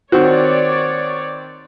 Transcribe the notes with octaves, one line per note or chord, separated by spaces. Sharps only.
D#3 C4 F#4 C#5 D5